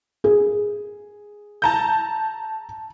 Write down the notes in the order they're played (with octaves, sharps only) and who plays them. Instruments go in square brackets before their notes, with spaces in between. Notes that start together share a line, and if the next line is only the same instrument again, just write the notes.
[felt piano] G#4
[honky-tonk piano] A5 A#5 G6